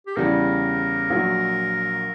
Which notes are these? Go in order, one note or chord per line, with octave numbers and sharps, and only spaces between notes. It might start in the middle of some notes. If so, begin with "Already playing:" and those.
G4
E2 C#3 G3 A#4
A#1 A#2 F#3